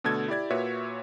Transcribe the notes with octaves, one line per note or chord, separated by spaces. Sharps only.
B2 D3 A3 A4 G#6
E4 G4 D5 G#6
A#2 F#4 B4 C#5 E5